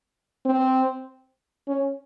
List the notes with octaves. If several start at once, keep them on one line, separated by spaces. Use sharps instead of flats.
C4
C#4